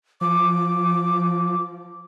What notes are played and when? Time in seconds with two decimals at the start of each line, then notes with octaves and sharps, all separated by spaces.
0.21 F3 D6